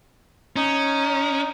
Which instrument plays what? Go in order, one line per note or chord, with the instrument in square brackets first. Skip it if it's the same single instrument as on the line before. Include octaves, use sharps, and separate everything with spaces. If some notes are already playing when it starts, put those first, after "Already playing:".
[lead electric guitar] C#4 [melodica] D#4